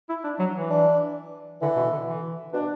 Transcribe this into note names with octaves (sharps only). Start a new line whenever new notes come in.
E4
D4
F#3
E3
D4
D3 E3
B2
D3
E3
B2 D4